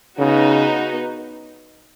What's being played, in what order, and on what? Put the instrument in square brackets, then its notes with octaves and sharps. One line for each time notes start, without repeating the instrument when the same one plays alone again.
[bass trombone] C#3 [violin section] B3 D#4 F#4